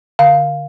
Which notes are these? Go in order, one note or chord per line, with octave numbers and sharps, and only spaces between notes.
D3 F5